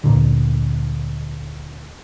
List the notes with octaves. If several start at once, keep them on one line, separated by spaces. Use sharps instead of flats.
D2 A#2 D3